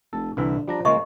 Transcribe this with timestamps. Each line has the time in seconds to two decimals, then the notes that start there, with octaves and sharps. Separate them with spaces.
0.13 F1 A4
0.37 C2 D3 E3 E5
0.68 F3 G3 D4 A#5
0.85 C#3 G#3 A#3 D#5 E5 C#6